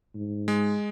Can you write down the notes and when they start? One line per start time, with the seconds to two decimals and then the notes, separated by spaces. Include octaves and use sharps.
0.15 G#2
0.48 G#3